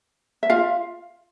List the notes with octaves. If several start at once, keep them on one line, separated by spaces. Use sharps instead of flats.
E5
F4 F5